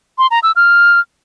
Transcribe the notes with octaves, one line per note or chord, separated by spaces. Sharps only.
C6
A#5
E6
F6